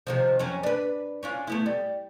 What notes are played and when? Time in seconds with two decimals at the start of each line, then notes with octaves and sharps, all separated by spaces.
0.07 C3 D#3 F3
0.39 F2 F#3 C#4
0.63 D4 B4
1.23 C#4 D4 F4
1.47 A3 B3 E4
1.66 G3